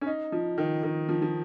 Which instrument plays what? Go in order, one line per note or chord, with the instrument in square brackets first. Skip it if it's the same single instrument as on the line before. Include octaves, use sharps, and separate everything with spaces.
[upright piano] C#4
D#4
F3
D#3
D#3
F3
F3